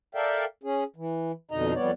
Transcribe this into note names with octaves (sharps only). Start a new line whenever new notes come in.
A4 A#4 D5 E5 F5 G5
C#4 G#4
E3
F2 B2 D3 D#4 D#5 A#5
F2 G3 B3 C#5 D5